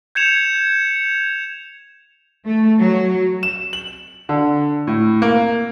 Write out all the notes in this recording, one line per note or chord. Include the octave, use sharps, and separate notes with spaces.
G6 G#6 C#7 E7 F7
A3
F#3
E7
F#7
D3
A2
A#3